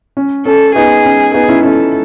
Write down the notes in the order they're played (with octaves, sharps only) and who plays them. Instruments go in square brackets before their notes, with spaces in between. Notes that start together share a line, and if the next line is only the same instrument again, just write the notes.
[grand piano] C#4
[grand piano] C#4 [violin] A4
[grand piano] B3 D#4 [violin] G#4
[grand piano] C#4
[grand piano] B3 D#4 [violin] G#4
[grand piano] C#4 E4
[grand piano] C#4 E4 [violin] A4